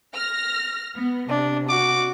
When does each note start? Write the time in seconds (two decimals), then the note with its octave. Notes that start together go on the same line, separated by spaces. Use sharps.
0.14 F6 A#6
0.95 B3
1.29 C3 D4
1.69 F#4 D6